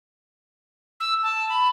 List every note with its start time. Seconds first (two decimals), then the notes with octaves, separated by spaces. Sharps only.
1.00 E6
1.23 A5
1.49 B5